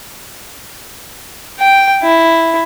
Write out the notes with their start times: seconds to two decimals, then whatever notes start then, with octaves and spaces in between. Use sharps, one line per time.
1.60 G5
2.03 E4